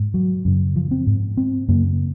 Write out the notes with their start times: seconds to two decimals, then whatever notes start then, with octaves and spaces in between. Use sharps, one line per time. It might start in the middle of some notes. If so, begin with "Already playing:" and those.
Already playing: G#2
0.14 F#3
0.45 F#2 C#3
0.76 F3
0.91 C4
1.07 G#2
1.37 C4
1.68 F#2 C#3 A#3